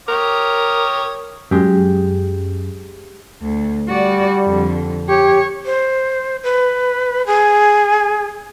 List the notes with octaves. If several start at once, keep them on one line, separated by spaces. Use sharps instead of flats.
G4 A#4 C#5 D#6
F#2 G#3 G4
D2
G3 F#4 D5
F2 D3
G4 C#5
C5
B4
G#4